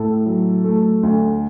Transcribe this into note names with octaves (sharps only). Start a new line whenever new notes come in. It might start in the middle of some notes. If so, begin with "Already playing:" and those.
Already playing: A2 A4
F#3
A3
D2